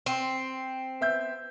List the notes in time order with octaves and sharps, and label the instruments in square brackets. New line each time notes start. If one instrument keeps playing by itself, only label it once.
[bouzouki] C4
[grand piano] B3 E5 G6